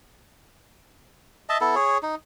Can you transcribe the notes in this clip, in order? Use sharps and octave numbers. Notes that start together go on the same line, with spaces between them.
D#5 E5 A5
B3 E4 A4
G#4 C#5
D#4